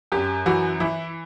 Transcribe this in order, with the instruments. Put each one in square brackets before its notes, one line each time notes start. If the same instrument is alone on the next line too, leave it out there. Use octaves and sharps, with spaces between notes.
[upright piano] F#2 G4
E3 F#4
E3 E4